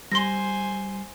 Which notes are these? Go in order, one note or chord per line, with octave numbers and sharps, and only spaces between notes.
G3 C5 G#5 C6 A#6